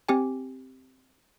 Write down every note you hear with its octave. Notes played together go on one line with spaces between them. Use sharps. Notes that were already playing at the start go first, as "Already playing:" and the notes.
C4 G4 G#5